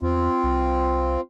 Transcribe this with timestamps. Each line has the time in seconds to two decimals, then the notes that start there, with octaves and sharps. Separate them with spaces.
0.02 E2 C4 F4
0.43 C2